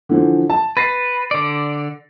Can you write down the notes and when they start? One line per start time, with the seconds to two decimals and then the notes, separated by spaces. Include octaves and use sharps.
0.09 D3 E3 F3
0.50 A5
0.77 B4 A6 A#6 C7
1.31 D3 D5